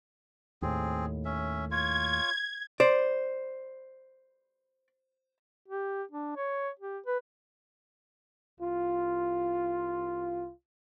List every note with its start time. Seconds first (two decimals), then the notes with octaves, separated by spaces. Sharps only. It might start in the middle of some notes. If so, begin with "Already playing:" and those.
0.62 D#2 A2 C4 G#4
1.25 C#4 E5
1.71 F4 C#5 G#6
2.80 C5 D5
5.68 G4
6.11 D4
6.36 C#5
6.79 G4
7.06 B4
8.60 C2 F4